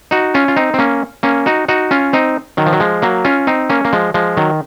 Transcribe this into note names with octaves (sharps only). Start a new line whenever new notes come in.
D#4 F#4
C#4 F4
F4
C4 D#4
C4
A#3 C#4
A#3 C#4
D#4 F#4
D#4 F#4
C#4 F4
C4 D#4
D#3 F#3
F3
F#3
F3 G#3
F#3 A#3
C#4 F4
C4 D#4
A#3 C#4
A#3
F3 G#3
F3 G#3
D#3 F#3